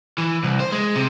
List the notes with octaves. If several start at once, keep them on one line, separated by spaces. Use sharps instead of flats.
E3
C2
C5
G#3
C3